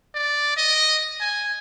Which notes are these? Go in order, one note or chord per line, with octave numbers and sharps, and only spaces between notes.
D5
D#5
G#5